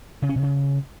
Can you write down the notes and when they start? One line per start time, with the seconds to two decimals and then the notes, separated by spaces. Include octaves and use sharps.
0.22 C#3
0.29 C#4
0.36 C3
0.42 C#3